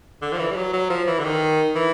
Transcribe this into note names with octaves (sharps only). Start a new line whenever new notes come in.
D3
F3
E3
G3
F#3
F#3
F3
E3
D3
D#3
E3